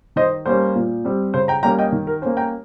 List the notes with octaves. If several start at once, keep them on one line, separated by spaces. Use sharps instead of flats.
D#3 C5 D#5
G3 A#3 C#4 C5
A#2
G3 C4
C#3 C5
G5 A#5
G3 A#3 C#4 G5 A#5
D#5 G5
D#3
A#4
A#3 C#4 C5
G5 A#5